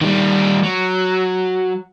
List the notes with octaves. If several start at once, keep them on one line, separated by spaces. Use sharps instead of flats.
D#3 G3
F#3